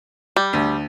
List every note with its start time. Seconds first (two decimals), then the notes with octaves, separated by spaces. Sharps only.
0.36 G3
0.53 D2